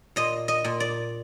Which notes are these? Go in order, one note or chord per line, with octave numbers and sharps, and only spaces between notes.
A#2 D#5
D#5
A#2
D5